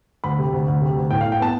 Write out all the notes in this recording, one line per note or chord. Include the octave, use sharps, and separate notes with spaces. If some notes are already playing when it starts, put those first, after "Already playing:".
D2 B5
C3
D2
D2
C3
D2
A2 G5
F5
A2
G5
B3 A5